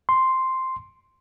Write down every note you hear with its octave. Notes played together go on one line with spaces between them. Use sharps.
C6